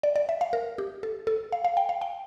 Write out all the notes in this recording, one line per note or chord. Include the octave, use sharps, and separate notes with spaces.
D5
D5
E5
F5
A#4
G4
A4
A4
F5
F5
G5
F5
G5